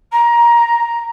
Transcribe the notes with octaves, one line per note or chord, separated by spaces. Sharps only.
A#5